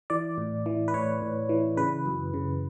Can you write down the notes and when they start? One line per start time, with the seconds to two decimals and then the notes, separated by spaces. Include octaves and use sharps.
0.10 E3 D5
0.38 A2
0.66 E3
0.88 B4
0.94 A2 C#5
1.22 A2
1.49 E3
1.77 C#3 B4
2.06 F#2
2.34 C#3